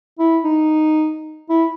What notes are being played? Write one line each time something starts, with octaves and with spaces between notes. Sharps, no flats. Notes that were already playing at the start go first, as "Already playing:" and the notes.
E4
D#4
E4